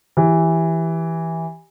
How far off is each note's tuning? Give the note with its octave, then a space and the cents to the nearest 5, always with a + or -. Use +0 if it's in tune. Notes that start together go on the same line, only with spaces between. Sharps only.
E3 -5 G4 +0